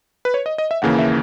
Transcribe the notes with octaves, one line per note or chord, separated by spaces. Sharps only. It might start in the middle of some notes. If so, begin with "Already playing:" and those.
B4
C#5
D#5
D#5
E5
D#2 C#3 E3 A#3 F#5
E5